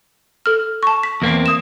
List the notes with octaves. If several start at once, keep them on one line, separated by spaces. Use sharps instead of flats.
A4 F6
A5 C#6
B6
E2 A#3 C4
D#6 E7